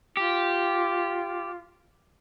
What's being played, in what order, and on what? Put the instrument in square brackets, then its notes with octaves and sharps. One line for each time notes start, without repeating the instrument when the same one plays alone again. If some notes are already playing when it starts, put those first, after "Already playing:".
[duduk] F4 [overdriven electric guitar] G4